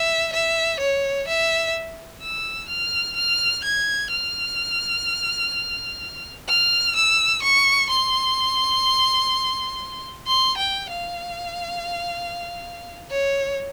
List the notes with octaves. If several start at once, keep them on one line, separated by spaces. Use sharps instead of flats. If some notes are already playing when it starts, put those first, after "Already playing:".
Already playing: E5
E5
C#5
E5
E6
F6
F6
G#6
F6
F6
E6
C#6
C6
C6
G5
F5
C#5